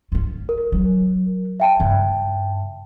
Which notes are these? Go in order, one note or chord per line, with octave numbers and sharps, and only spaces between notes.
C#4 F4
A#4
F#3
E5 G5 A5
G2 C#3